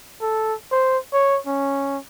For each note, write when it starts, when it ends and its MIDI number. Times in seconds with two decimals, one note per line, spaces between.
0.22 0.54 69
0.72 0.98 72
1.13 1.38 73
1.47 1.97 61